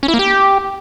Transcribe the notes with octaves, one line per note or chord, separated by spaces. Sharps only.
C#4
E4
A#3
G4